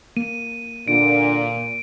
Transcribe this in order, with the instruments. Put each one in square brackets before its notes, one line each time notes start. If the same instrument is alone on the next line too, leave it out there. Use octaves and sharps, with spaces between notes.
[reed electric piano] A#3 [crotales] D#7
[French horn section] A#2 [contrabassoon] D3 [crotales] D7